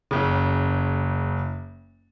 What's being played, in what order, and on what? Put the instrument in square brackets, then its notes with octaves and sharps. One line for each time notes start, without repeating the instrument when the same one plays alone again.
[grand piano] F#1 C#3